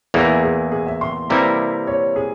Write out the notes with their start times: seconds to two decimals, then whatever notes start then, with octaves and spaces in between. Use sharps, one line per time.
0.14 E2 E3 A#3 G#4
0.43 G#4
0.72 G#4
0.87 E5
1.01 C6
1.30 C3 E3 G3 A#3 E4 A#5
1.87 C#5
2.16 G#4